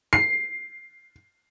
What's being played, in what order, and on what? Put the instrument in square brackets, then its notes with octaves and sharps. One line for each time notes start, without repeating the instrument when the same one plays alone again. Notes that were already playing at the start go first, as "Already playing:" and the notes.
[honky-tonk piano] C7